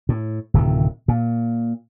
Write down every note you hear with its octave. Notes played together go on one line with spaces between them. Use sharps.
A2
D1 C3 D#3
A#2